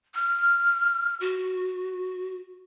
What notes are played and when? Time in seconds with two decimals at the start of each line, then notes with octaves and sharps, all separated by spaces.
0.15 F6
1.21 F#4